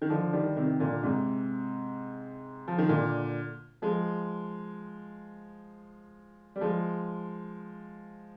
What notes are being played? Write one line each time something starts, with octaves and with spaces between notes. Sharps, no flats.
D#3
D3 F3
D#3 G3
C3 D#3
A#2 D3
G#2 C3
F3
D#3
A#2 D3
F3 G#3
G3
F3 G#3